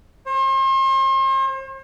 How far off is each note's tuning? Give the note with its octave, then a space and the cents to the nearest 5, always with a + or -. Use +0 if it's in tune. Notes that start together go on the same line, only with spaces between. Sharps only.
C5 +40